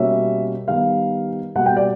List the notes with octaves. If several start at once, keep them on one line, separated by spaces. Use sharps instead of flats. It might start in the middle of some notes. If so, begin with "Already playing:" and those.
Already playing: B2 G3 A#3 C#4 E5
D#3 G3 B3 F5
B2 G3 A#3 F#5
G5
D5